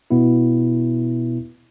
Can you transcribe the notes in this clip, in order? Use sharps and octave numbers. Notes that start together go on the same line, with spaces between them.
B2 B3 E4